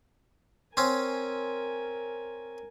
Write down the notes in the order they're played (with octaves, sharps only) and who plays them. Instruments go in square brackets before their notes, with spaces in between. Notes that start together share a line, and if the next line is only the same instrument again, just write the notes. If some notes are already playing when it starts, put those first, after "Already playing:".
[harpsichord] C4 C#4 [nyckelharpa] A#4 G#5